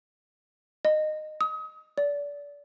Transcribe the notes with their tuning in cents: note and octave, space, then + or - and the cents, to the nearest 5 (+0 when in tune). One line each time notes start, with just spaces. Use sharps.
D#5 -20
D#6 +35
D5 -30